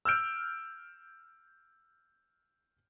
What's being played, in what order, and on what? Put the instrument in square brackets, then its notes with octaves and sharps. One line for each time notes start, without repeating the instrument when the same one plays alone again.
[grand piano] E6 F6 G6 D7